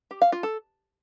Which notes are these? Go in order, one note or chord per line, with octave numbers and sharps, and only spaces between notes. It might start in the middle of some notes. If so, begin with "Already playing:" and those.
G4
F5
F4
A4